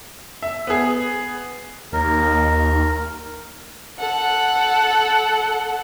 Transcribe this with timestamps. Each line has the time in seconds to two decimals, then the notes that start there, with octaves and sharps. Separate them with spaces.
0.42 E5
0.67 B3 G#4
1.93 D#2 A#4
3.98 A4 F#5